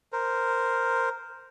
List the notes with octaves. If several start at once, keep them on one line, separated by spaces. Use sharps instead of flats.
A#4 C5